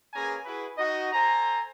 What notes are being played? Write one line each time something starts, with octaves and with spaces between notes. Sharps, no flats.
A#3 C#4 G#4 B4 G#5 A#5
E4 F#4 G#4 B4
D#4 F#4 D#5
A4 C5 G#5 A#5